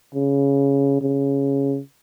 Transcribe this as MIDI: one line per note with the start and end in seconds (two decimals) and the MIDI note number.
0.15 0.98 49
1.01 1.79 49